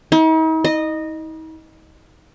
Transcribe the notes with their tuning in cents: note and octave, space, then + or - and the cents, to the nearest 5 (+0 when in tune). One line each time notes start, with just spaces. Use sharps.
D#4 +45
D#5 -15